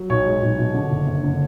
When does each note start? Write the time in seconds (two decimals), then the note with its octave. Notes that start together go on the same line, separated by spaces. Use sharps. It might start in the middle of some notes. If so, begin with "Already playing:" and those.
Already playing: F#3
0.09 B1 C#5
0.26 G#3
0.42 B1
0.58 B2
0.74 D3
0.91 F#1
1.07 F#1
1.23 D3